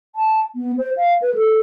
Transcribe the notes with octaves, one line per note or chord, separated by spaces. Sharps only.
A5
B3
C5
F5
B4
A4